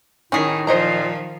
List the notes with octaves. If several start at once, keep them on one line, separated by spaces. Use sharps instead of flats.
A2 D#3 C#4 D#4 G#4
A#2 D#3 F3 C5 D#5 A#5